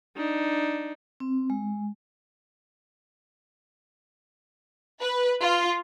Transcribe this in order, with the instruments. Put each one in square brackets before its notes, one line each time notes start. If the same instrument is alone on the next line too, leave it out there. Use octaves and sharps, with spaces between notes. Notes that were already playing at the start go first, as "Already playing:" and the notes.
[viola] D4 D#4
[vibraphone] C4
G#3
[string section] B4
F4